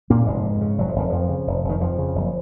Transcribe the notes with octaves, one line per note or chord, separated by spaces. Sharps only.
F1 A#2 A#3
F1 G#2 G#3
F2
C#3
F1 F#3
F3
F1 D#3
F2 F3
C#3
F1
F1
D#3
F2 F3
C#3
F#1